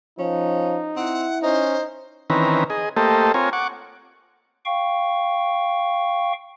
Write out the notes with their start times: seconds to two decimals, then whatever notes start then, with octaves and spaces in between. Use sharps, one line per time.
0.19 F3 C#4 D#4
0.96 C4 E4 F#5
1.43 C#4 D#4 C5
2.30 D#3 E3 C4 C#4 B4 A#5
2.70 G#4 D#5
2.97 A3 A#3 G4 A4 C5 D#5
3.34 C4 F4 A#4 C#5 G#5
3.53 F#5 C#6 D6
4.66 F5 G5 C#6